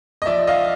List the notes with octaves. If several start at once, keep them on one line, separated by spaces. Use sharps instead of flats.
D#5
F3 D5 E5
D#5 F5